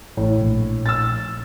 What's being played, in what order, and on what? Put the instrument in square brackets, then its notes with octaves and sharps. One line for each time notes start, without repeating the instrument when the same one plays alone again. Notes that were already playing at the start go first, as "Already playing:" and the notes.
[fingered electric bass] A1 [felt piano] A2
[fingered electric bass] A#1
[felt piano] E6 A6